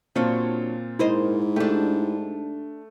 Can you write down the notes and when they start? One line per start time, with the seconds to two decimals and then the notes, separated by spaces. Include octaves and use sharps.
0.16 A#2 F#3 C4 D4 F4
0.99 G#2 E4 A#4 C5 D#5
1.56 A3 D4 G4